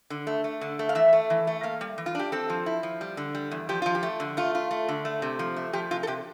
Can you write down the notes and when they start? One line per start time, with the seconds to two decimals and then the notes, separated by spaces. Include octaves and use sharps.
0.10 D3
0.27 A3
0.44 A3
0.61 D3
0.79 A3
0.89 F5
0.95 E3 E5
1.13 A3
1.30 E3
1.47 A3
1.63 A#3 F5
1.81 G3
1.98 E3
2.06 F4
2.15 D4 G4
2.32 C4 A4
2.50 F3
2.66 E4
2.83 F3
3.01 G3
3.17 D3
3.35 G3
3.51 E2
3.69 F3 G4
3.82 F3 F4
3.95 G4
4.03 A3
4.20 D3
4.37 A3 F4
4.55 F4
4.71 A3
4.88 D3
5.05 A3
5.22 C3
5.39 F3
5.56 A3
5.73 F3 G4
5.91 C3 F4
6.03 A4
6.07 C3 G4